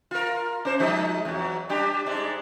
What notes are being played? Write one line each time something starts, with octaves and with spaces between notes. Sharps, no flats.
F4 A#4
C#4 C5
F3 G#3 D#4
E2 F#3
G3 D4 G4
G#2 G#3 D4